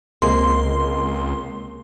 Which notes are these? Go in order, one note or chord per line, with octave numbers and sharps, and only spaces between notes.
C#2 C3 G#3 A#3 C6